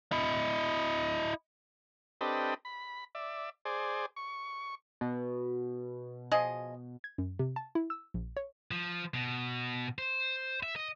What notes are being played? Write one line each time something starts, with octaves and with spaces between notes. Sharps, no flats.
E4 D#5
C4 D4 G4 A4 B4 D#5
B5
D5 E5
G#4 C5 D5
C#6
B2
F3 G#4 D#5
G#6
F#2
C3
A5
E4
E6
A#1
C#5
F3
B2
C5
E5
D#5